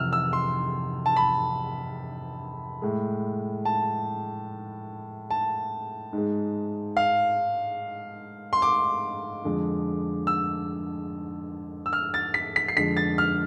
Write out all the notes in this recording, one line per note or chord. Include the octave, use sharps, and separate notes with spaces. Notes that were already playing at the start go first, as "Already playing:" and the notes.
Already playing: F2 C3 E3 E6 F6
E6
C6
A5
B5
A2 G#3
A5
A5
G#2
G#3
F5
C6
D6
F2 D3 G#3
E6
E6
F6
A6
B6
B6
C7
F2 D3 G#3 B6
A6
F6